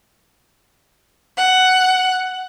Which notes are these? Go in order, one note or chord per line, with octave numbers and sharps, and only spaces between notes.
F#5